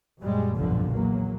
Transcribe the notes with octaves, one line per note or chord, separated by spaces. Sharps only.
F#2 A#2 G3 G#3
F1 B1 G2 A#2 D3 F3
E2 F#3 A#3